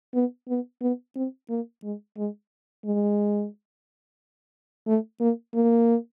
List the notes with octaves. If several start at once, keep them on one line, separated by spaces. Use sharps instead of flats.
B3
B3
B3
C4
A#3
G#3
G#3
G#3
A3
A#3
A#3